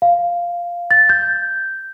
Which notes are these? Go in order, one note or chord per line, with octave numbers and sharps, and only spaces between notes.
F5
A6
G6